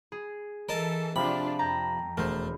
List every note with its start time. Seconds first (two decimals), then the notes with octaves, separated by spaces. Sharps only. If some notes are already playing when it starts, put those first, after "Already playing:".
0.12 G#4
0.69 E3 A4 A#4 D#5 A5
1.16 C3 F3 D4 F4 B5
1.59 F2 G5 A5 A#5
2.17 E1 A3 A#4 C5